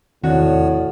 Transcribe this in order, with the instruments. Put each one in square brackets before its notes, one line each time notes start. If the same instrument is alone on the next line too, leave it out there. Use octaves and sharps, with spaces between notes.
[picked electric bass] F1 D#3 C4 [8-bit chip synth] E2 C#5 D5 [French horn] A2 [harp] F#4